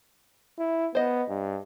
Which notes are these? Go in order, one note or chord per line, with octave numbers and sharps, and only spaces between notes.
E4
B3 C5 D#5
G2